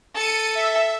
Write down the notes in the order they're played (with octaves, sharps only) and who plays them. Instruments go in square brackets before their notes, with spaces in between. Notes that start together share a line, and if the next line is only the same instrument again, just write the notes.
[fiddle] A4 [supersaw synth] C#7 D#7
[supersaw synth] E5